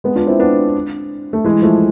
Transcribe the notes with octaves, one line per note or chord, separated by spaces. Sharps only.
G#3 B3
D4 F4
C4 E4
B3 D4
A3
E3 G#3
F3 A3